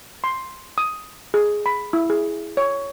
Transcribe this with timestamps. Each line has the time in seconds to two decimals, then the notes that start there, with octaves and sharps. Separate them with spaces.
0.24 C6
0.78 D#6
1.34 G#4
1.66 B5
1.93 E4
2.10 G#4
2.57 C#5